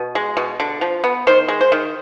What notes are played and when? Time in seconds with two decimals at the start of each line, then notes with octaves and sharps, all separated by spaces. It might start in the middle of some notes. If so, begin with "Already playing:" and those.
Already playing: B2
0.15 G#3
0.37 B2
0.60 D3
0.81 F3
1.04 B3
1.27 D#3 C5
1.48 G#3
1.61 C5
1.72 D#3